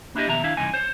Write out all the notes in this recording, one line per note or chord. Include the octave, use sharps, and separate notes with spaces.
A#3 D4 E4 F#4 G4 D#5
F2 B2 D#3 E5 A#5
D#3 D4 E4 E5 F5
C#2 G2 C3 E3 D#4 G#5
C5 C#5